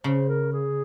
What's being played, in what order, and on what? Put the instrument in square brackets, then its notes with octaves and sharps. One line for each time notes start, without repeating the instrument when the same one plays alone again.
[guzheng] C#3 [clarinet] C5
[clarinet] A#4
G#4